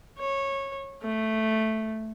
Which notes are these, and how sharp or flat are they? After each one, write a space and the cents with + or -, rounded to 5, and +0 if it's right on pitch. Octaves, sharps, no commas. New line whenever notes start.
C#5 -15
A3 +0